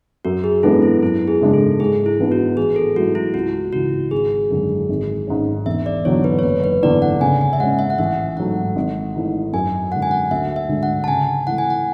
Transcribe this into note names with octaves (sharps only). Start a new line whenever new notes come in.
F#2 F#4
G#4
E3 G#3 B3 D4 A4
E4
F#2 E4
G#4
C#3 G#3 D4
A4
G#2 G#4
E4
E3 B3 D4
F#4
A1 G#4
A4
G#2 F#3 A3 E4 F#4
E4
C#2 F#4
C#3 E3 F#4
G#1 G#4
F#2 D3 G#3
G#1
G#2 G#3 C#4
E1 E5
D5
E2 D3 F#3 C#5
B4
C#5
F#1 B4
B4
E2 D3 D5
F#5
C#3 G#5
G#5
E5
G#3 C#4 F#5
E5
F#5
A1 E5
G#2 F#3 A3 F#5
G#1
G#2 E3 A3
F#2 G#5
D3 G#3 F#5
G#5
F#5
D2 E5
E5
D3 G#3 D4 A4
F#5
A5
C#3 G#5
E3 A3 F#5
G#5
F#5